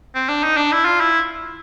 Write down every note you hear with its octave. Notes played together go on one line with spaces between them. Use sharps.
C4
D4
D#4
D4
E4
F4
E4